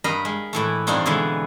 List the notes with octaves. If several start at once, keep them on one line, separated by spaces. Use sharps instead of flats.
G2 A#4 D#5 F5 B5
G#3
A2 E3 A3
G2 C4 D4 D#4 F4 C#5
B2 D3 E3 G#3